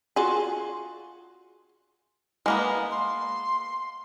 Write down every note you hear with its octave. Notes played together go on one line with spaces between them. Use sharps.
F4 F#4 G#4
G#3 A#3 B3
C6